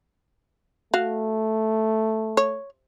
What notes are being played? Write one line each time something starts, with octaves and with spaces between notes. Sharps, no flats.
A3 F#4 F5
C#5